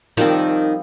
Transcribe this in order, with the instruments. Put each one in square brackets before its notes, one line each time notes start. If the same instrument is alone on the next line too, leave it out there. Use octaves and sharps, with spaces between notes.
[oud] D#3 [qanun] F3 G3 C4